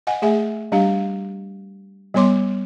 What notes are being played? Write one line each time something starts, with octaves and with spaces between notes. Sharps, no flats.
D#5 F#5 G#5
A3 G#4 E5 G#5
G3 D4 G4 F5
G3 B3 C#5 C6 D6